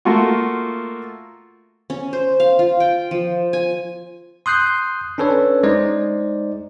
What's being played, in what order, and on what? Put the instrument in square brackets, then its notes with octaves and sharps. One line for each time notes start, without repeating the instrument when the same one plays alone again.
[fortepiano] A3 A#3 F4 F#4
[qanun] C#4
C5
F5
F4
G5
F3
G#5
[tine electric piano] C6 D#6 F#6 G6 C7
C#4 D4 A4 B4 C#5
G#3 D#4 C5 D5